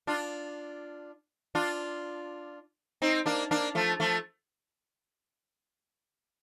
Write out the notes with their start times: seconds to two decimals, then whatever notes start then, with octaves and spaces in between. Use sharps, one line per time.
0.07 D4 F4
1.55 D4 F4
3.02 C4 D#4
3.26 A#3 D4
3.51 A#3 D4
3.75 F3 A3
4.00 F3 A3